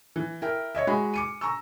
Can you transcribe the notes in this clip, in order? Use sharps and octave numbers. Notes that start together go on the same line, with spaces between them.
E3
E4 A#4 G5
C#5 D#5 E5
G#3 F#4 B5
D6 C#7 D#7
A#5 C#6 E6